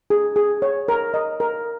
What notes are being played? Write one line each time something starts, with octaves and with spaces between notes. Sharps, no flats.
G#4
G#4
C#5
A#4
D#5
A#4